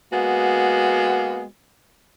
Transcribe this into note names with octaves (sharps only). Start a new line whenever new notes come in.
G#3 A#3 B3 F#4